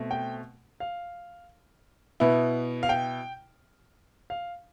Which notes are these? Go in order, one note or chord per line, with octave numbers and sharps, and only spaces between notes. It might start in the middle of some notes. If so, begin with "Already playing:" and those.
Already playing: B2 A3 C4
G5
F5
B2 B3 E4
F5
G5
F5